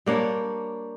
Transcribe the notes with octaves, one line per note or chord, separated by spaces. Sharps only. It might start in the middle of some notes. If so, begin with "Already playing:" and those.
G3 A#3 D4 C#5